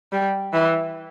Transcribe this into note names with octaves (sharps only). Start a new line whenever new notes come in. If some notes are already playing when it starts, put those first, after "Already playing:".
G3
E3